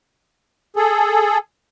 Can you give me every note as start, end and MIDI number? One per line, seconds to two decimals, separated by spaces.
0.76 1.38 68
0.76 1.38 69